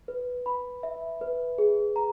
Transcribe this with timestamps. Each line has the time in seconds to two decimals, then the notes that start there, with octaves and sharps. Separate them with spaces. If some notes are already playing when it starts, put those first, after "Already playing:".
0.08 B4
0.46 B5
0.83 E5
1.21 B4
1.58 G#4
1.96 A#5